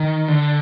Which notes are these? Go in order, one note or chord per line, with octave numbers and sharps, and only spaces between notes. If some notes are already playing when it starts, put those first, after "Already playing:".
Already playing: D#3
D3